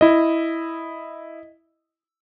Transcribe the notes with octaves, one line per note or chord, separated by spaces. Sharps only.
E4 D#5